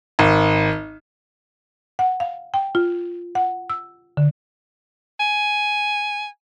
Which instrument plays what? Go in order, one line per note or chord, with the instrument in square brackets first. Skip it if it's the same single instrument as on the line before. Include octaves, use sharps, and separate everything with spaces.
[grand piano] G#1
[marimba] F#5
F5
G5
F4
F#5
E6
D3
[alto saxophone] G#5